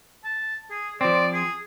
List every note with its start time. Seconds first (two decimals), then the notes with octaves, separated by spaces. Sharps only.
0.24 A5
0.71 G#4
1.01 F3 C4 D5
1.34 G#4